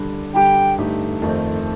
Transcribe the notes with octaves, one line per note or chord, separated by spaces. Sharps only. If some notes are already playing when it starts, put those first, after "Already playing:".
Already playing: D3 G3 D4
D3 G3 D4 G4 G5
G2 D3 A3 D#4 G4
F2 D#3 A3 C4